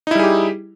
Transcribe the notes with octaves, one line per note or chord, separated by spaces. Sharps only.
G3 D#4 E4 G4 G#4